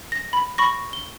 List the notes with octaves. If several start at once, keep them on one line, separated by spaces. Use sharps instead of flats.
A#6
B5
B5 C#6 A#6
G7